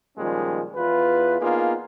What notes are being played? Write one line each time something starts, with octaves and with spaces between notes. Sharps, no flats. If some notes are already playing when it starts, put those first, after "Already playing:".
A#2 D#3 F3 G3 G#3 C#4
E2 F4 B4
A#3 B3 D4 D#4 F4 G#4